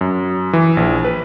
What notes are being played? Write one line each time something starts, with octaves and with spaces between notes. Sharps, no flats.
F#2
E3
A#1
B4